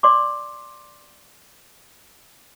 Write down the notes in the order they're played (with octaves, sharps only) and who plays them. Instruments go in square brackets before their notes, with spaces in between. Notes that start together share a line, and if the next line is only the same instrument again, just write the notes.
[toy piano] D5 C6 D6